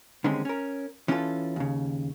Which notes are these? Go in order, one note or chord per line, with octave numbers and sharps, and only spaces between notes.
D3 D#3 G3 G#3 C4 C#4
C#4 A#4
E3 C#4 D4 E4 F4 A4
D#2 C#3